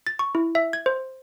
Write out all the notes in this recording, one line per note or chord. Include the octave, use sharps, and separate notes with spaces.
A6
C#6
E4
E5
G#6
C5